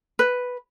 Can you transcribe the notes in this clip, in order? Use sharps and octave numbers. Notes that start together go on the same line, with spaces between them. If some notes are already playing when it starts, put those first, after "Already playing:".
B4